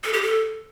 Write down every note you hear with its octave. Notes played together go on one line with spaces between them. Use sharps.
A4
G4
A4